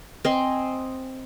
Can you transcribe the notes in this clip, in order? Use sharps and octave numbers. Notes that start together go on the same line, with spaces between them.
C4 D#5 G#5 C6